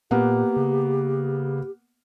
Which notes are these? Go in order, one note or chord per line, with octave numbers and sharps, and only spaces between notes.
A#2 A#3 B3 G4 F#5
C#3